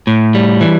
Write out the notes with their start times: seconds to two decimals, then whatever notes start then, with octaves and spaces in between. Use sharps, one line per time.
0.07 A2
0.34 G3
0.61 E3